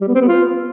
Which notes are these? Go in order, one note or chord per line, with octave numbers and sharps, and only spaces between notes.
G3
B3
C4
B3
F4